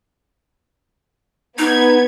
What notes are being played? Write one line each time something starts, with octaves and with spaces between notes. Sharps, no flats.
B3 D#4 G#6